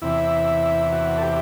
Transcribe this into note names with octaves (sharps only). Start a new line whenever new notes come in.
E2 C3 E3 E4
F#4
A4
G4